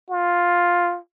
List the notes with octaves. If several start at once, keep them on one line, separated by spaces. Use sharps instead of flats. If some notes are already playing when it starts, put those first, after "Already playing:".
F4